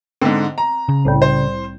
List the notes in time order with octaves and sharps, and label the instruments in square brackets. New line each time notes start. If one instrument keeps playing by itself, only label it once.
[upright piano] G#2 D3 [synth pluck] C4
[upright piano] A#5
[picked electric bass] C#3
[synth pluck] C2 A2 G3
[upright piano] C5